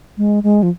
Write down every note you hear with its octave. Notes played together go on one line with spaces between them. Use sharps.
G#3
G#3
F3